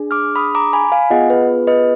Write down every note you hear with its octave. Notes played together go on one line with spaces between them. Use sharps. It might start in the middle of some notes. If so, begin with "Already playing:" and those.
Already playing: D4 G#4
D6 F6
B5 D#6
A#5 D6
G#5 B5
F5 G#5
B3 F4 G#4 D#5 F#5
B4
B4 D#5